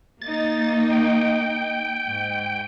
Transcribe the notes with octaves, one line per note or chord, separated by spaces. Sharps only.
A#3 D#4 A6
G5
G#2